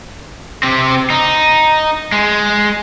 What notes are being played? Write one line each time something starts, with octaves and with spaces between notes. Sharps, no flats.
C3 C4
D#4
G#3